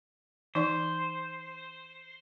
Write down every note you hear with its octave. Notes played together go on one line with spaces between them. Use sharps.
E3 D#4 C5 D5